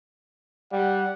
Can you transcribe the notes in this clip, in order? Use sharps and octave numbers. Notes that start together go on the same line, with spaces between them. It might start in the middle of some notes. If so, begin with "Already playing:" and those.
G3 F#5